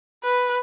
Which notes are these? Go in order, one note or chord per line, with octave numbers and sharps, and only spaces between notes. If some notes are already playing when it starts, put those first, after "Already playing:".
B4